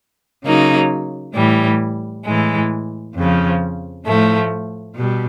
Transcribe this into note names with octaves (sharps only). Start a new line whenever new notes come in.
C#3 F#3 A#3 D#4
A2 E3 G3
A2 E3 G#3
F2 C#3 F3
A2 F3 A3
B2 G3